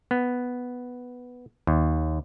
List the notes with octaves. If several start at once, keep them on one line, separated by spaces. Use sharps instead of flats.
B3
D#2